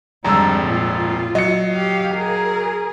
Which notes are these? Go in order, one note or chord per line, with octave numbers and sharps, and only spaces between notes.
G#1 F2 D3 G3 G#3 A#5 E6
A#2 F4
F#3 D#5 C#7
G4 F5
G#4 A#4